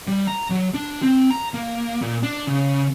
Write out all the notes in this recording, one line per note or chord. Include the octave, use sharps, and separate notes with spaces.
G3
A#5
F#3
D4
C4
A#5
A#3
A#2
D4
C#3